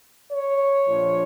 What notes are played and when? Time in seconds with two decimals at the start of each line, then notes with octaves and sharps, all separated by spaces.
0.31 C#5
0.86 A#1 A#2 F3